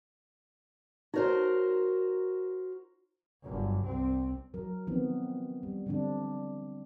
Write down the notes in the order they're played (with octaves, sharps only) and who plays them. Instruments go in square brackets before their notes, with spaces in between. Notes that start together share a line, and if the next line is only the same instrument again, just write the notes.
[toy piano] D#4 C#5 [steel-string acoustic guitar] F#4 A#4 C5
[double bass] G1 F#2
C2 C4
[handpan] F#3 A#4
D#3 F3 B3 C4
G3
D3 F3 G3 C4 D4